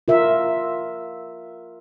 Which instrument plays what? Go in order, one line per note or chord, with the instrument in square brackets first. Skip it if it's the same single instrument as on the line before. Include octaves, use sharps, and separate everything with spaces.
[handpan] F4 A#4 E5